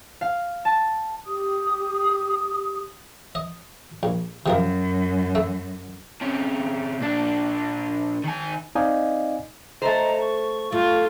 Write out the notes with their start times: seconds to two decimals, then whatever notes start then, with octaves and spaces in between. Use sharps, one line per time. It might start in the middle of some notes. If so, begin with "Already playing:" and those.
0.21 F5
0.65 A5
1.25 G4 D#6
3.35 D#5
4.03 A#1
4.46 F#2 C3 F3 A#4
5.35 A3
6.21 C3 C#4
7.00 A#2 D4
8.24 D#3 G#5
8.75 C4 D#4 D5 D#5 F5 G#5
9.82 A3 C5 D#5 A#5
10.21 C#6
10.72 A3 F4